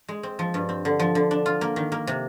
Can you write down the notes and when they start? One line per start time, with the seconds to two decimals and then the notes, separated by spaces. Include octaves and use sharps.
0.08 G#3
0.23 C4
0.39 F3
0.54 G2
0.69 C4
0.85 D3
0.99 F3
1.15 D3
1.31 D4
1.46 F4
1.61 A#3
1.76 D#3
1.92 A#3
2.07 C3